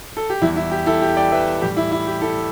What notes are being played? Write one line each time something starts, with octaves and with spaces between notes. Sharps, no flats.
A4
G4
E2 E3 G3 E4
E4
G4
E4 A4
G4
D5 G5
B4 E5
A2 E3 G3 G4
E4
E4
G4
E4 A4